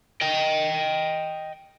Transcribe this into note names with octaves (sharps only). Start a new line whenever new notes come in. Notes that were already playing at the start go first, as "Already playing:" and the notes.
D#5 G5